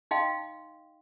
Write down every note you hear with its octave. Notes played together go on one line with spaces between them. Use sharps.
D#4 D#5 F5 G5 C6